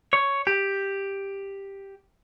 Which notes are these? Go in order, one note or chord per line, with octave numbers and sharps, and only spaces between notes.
C#5
G4